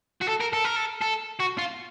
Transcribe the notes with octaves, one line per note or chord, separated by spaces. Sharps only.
F#4
A4
A#4
A4
A#4
A4
A4
F#4
F4